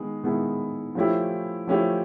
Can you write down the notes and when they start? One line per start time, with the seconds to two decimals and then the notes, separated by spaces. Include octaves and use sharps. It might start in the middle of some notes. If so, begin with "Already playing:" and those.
Already playing: D#3 G#3 B3 G#4
0.23 D#3 G#3 B3 E4 G#4
0.95 F3 A3 C#4 E4 G4
1.67 F3 A3 C#4 E4 G4